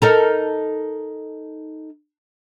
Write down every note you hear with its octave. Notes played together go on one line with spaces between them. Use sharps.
D#4 A4 A#4